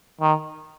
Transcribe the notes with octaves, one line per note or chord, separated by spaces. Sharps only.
D#3